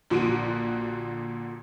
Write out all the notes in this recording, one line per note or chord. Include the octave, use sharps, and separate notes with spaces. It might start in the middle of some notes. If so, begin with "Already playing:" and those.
A#1 A#2 D3 F#4 D7 D#7